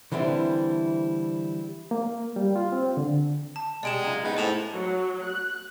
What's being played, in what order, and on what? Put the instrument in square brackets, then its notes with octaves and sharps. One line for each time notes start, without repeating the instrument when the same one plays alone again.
[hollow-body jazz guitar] D3 E3 G3 C4 E4
[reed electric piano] A#3
G3
F4
C4
D3
[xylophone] A5
[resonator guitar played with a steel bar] B2 G4 [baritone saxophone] G#3 [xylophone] D5 D7 E7
[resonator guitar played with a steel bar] F#2 F4
[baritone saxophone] B3 [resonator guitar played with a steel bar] C4 D#4 G#4
[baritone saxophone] A2 [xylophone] C5 E7 F7
[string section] F#3
F#6